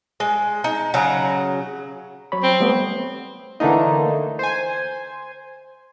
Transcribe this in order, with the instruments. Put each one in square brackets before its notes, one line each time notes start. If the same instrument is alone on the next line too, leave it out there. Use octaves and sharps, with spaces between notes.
[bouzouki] G#3
D#4
C#3 F#3 F#5 A#5
[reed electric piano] F#3 C#5 B5
[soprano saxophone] C4
[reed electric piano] G3 A3 B3
[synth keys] D3 E3 A3 A#3 D#4
C5 G#5